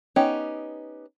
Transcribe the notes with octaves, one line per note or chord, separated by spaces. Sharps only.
B3 C#4 D#4 G4